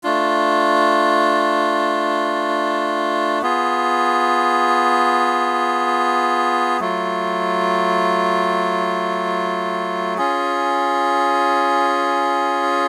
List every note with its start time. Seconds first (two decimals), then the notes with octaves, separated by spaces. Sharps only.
0.03 A3 D4 F4
3.42 B3 F4 G#4
6.80 F#3 A3 F4
10.18 C#4 F4 G#4